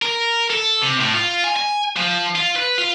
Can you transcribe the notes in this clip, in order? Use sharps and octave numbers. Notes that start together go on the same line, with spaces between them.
A#4
A4
C3
A2
F4
G#5
G#5
F3
F4
B4
F4